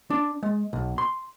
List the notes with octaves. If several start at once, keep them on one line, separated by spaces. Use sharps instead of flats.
D4
G#3
B1
C6